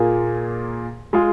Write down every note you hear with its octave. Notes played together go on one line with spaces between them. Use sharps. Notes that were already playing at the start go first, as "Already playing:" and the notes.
Already playing: A#2 A#3 F4 G#4
G#3 F4 G#4